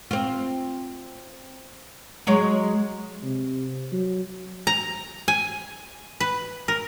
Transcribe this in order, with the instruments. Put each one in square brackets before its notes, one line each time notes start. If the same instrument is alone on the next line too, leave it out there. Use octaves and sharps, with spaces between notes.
[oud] C4 F4
F#3 G#3 C#5
[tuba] C3
F#3
[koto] A#5
G#5
B4
A#4